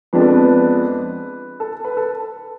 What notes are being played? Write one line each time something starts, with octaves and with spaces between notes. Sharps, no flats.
F2 F3 G#3 B3 D4 B4
A4
B4
A4
B4
A4